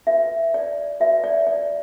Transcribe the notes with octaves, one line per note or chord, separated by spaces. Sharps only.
F#4 B4 E5
D5
F#4 B4 E5
D5
D5